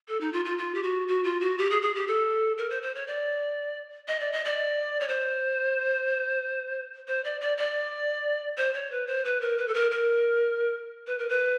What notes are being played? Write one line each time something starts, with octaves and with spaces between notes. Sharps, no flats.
A4
D#4
F4
F4
F4
G4
F#4
F#4
F4
F#4
G4
G#4
G#4
G4
A4
A#4
C5
C5
C#5
D5
D#5
D5
D#5
D5
C#5
C5
C5
D5
D5
D5
C5
C#5
B4
C5
B4
A#4
B4
A4
A#4
A#4
B4
A#4
B4